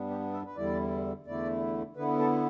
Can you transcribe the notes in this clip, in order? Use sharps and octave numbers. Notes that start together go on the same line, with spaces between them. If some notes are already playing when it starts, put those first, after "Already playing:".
Already playing: G2 G3 B3 D4
G4
E5
B4
E2 D3 G3 E4 D5
E2 D3 A3 E4 D5
D3 B3 E4 B4
A4